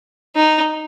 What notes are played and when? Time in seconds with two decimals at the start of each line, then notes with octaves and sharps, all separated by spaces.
0.36 D#4